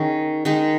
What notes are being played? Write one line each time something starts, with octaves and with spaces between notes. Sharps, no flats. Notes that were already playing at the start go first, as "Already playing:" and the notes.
Already playing: D#3 C#4 G#4
D#3 G#3 D#4